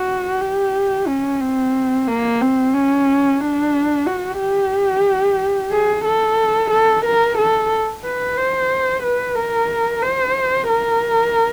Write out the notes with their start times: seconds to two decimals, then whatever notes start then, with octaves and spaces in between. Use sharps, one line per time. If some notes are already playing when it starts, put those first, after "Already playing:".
Already playing: F#4
0.42 G4
1.08 C#4
1.41 C4
2.08 A#3
2.41 C4
2.74 C#4
3.40 D4
4.06 F#4
4.40 G4
5.72 G#4
6.05 A4
6.71 A4
7.05 A#4
7.38 A4
8.04 B4
8.37 C5
9.03 B4
9.36 A#4
10.03 C5
10.70 A#4